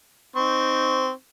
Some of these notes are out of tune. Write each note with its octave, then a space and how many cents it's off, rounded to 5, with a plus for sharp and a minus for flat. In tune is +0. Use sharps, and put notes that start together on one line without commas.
C4 -10 D#4 +0 C#6 +0